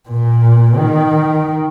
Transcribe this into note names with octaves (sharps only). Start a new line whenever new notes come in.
A#2
D#3